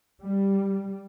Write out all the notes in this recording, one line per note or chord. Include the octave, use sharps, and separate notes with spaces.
G3